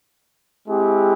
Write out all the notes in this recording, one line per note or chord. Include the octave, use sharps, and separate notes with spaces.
G#3 C4 E4 G4